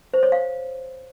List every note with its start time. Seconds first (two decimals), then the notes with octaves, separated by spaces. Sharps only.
0.14 C5
0.23 C#5
0.32 F5